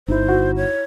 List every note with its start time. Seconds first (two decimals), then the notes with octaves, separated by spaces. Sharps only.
0.08 G1 D#4 E4 C5
0.28 F#4
0.56 C#5